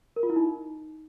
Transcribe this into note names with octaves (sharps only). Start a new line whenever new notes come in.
A#4
F4
E4
D#4